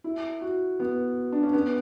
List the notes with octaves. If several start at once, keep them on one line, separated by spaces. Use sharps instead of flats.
E4
F#4
B3
D4
C#4
B3